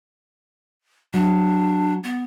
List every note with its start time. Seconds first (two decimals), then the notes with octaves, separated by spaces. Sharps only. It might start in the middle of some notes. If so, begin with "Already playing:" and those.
1.14 F#3 D4
2.04 B3